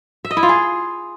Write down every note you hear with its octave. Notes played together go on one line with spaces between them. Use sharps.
E5
D#5
E4
F4
G#4